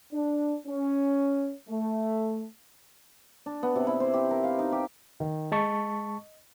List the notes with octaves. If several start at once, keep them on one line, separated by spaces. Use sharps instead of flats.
D4
C#4
A3
D4
B3
C3
E4
C5
G4
A#4
F5
D#4
G4
D#3
G#3 D#5 A5 C#6